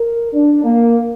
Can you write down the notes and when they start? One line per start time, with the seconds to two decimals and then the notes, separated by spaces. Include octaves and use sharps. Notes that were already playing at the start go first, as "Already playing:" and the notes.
Already playing: A#4
0.33 D4
0.64 A#3